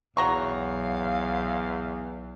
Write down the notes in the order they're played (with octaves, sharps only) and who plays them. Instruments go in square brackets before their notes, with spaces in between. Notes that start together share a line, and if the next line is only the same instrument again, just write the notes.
[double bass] B1 [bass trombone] E2 [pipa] F#3 A#5 C#6 [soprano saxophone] F5